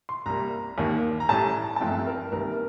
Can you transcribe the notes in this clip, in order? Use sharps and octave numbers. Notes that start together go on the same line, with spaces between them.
C6
C2 C3 G3 A#3 A#5
D#2 D#3 A#3
A#5
A1 A2 G3 A5
A5
G1 G2 F3 A3 C4 G5
A#4
C2 C3 D#3 G3 A#3 A#4